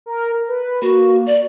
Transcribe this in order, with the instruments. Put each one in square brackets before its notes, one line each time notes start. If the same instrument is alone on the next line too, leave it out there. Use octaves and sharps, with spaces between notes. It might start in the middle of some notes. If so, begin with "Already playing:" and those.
[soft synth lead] A#4
B4
[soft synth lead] A#3 [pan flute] F#4
[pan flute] D5